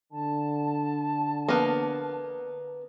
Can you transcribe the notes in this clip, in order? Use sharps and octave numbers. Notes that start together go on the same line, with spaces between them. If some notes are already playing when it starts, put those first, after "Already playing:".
D3 A5
A#3 B3